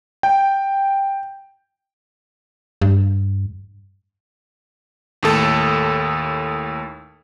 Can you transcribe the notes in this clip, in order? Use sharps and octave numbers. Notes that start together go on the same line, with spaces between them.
G5
G2
D#2 A2 A4